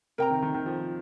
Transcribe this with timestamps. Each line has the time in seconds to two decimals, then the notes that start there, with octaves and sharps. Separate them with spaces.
0.18 C3 A#4 G5 A#5
0.31 D#3
0.42 D#3
0.54 D#3
0.66 F3